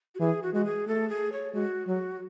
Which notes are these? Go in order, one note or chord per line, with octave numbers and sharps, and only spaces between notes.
F#4
E3 G#4
F#4
G#3 F#4
G#4
A3 A4
G#4
C#5
G#3 F#4
F#3 F#4